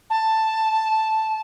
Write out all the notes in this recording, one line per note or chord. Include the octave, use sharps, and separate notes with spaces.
A5